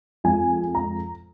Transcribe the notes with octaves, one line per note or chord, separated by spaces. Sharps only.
F2 F3 G#3 G#5
A#5